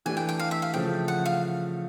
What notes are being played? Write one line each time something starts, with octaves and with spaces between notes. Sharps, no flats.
E3 A3 D4 G4 G#5
G5
G5
F5
E5
F5
C#3 F3 A3 G5
F#5
F5